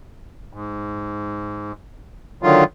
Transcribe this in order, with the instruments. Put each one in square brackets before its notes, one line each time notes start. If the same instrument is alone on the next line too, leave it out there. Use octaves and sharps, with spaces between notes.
[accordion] G#2
D3 D#3 F#3 F4